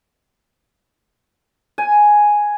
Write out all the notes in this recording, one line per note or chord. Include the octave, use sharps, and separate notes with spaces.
G#5